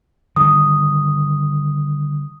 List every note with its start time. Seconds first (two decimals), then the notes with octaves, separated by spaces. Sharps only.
0.36 D3 D#3 G3 D#6